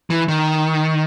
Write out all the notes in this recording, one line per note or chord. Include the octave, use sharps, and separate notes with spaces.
E3
D#3